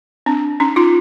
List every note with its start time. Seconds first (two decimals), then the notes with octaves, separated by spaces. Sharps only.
0.26 C4 D4
0.60 C#4 D#4
0.76 D#4 F4